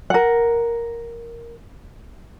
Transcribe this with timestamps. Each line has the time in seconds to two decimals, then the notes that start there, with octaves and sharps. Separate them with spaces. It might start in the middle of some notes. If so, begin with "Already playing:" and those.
0.10 A#4 F#5